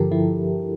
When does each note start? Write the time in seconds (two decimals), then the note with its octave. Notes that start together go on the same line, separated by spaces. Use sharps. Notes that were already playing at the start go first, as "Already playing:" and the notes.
Already playing: G2 D3 F3 G4 A4 A#4
0.12 F3 E4